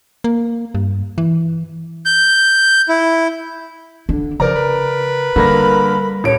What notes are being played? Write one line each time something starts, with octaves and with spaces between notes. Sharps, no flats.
A#3
G2
E3
G6
E4
D3 D4
C#3 F3 A#4 D5 A#5
B4
D3 G3 A#3 A#4 B5 A#6
D#1 C#5 D7